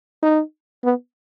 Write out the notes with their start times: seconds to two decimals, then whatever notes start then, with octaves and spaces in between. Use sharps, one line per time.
0.22 D#4
0.84 B3